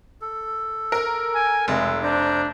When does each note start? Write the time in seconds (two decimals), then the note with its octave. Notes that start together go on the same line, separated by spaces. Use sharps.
0.21 A4
0.92 A#4
1.35 G#5
1.68 F1 G#3
2.03 D4 C5 A#5